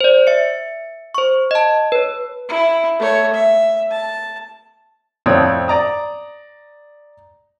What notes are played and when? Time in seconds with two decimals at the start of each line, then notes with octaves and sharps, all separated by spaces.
0.01 C5 D5
0.27 E5 C#7
1.15 C5 C#6
1.51 D#5 A5
1.92 B4 C#5
2.49 E4
3.00 A3 C#5
3.34 E5
3.91 A5
5.26 F2 A2 C4 C#5 D5 D#6
5.68 D5 A#5 D#6